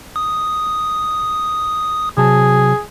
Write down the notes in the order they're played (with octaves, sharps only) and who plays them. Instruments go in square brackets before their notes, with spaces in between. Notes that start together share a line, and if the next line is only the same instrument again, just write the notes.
[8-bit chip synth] D#6
[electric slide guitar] C3 F#3 A5 [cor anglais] G#4